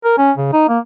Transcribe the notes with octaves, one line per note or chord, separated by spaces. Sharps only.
A#4
C#4
C#3
D#4
A#3